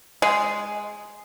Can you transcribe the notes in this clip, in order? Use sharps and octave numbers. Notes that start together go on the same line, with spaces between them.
G#3